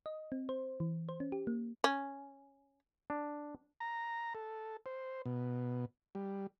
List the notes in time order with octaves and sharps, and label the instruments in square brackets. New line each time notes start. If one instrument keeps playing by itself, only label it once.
[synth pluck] D#5
C4
C5
E3
C5
C#4
G4
A#3
[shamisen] C#4
[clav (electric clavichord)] D4
[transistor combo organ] A#5
A4
C5
B2
G3